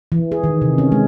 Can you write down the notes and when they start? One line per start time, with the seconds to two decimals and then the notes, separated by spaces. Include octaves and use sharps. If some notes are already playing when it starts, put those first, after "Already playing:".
0.12 E3
0.32 G#4
0.44 D#3
0.62 C3
0.78 C#4
0.92 G#3